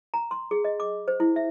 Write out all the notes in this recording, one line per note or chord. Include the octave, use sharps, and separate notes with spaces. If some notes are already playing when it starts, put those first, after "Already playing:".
A#5
C6
G#4
D#5
D6
C5
E4
E5